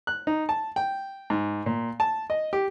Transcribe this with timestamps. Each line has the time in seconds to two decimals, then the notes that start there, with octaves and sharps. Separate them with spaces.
0.07 F#6
0.27 D#4
0.49 A5
0.76 G5
1.30 G#2
1.66 A#2
2.00 A5
2.30 D#5
2.53 G4